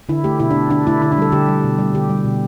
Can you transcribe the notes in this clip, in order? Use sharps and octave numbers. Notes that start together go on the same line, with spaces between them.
D3 E4
A3 G4
B2 E4
D4
A3
D3 D4
A3 E4
D3 E4
D4
G3 A4
D3 G4
G3
B2
G3
D3 G4
G3
B2